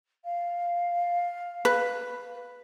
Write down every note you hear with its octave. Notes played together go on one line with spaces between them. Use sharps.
F5
B4